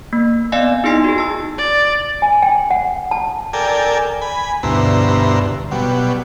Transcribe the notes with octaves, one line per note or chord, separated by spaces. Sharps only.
A#3
B3 C4 D5 D#5 F5 G#5
D#4 E4 G#4 D#5 C6 C7
F#4 G#4
A5 E6
D5
G#5
G5
F#5
A5
A4 A#4 D5 G5 G#5
G#5 B5
D2 G2 B2 E4 C5 A#5
B2 F#3 G3